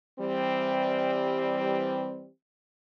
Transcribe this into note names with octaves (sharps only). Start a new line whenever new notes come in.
E3 G3 C4